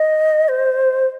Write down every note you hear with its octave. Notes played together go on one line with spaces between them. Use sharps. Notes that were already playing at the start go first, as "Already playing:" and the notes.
Already playing: D#5
C5